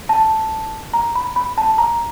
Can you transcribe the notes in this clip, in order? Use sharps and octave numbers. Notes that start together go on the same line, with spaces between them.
A5
A#5
B5
B5
A5
A#5